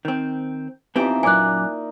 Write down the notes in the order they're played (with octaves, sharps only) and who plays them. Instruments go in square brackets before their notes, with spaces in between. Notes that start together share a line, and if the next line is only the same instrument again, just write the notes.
[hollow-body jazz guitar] D#3 C4
[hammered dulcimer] E3 F3 D#4 [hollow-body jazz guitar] B3 C4 G4
[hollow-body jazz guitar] F#2 A#2 [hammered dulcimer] A#3 D#4 D5 [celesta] G#5 D6 F#6